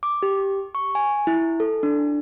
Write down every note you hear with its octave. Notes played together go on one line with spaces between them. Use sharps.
D6
G4
C#6
G#5
E4
A4
D4